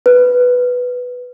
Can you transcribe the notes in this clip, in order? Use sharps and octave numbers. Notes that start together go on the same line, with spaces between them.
B4